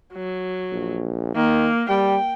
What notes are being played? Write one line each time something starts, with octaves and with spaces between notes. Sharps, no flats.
F#3
A#1
D#3 A#3
G3 G5